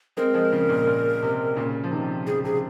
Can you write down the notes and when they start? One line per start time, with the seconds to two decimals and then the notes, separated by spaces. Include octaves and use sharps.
0.17 G#3 C4 A#4
0.34 F3 G#3
0.52 C#3 F3
0.69 A#2
0.87 A#2
1.22 C3
1.56 A#2 C#3
1.84 F3
1.91 C3 D#3
2.27 C#3 F3 G#4
2.44 C3 G#4